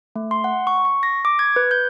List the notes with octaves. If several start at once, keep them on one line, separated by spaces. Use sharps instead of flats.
A3
C6
F#5
C#6
C#6
A#6
D6
G#6
B4
G6